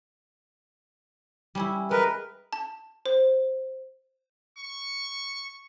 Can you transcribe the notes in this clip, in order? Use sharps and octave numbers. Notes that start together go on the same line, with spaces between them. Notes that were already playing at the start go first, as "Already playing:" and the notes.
G3 C#4 E4
G#3 A#4 B4
A5
C5
C#6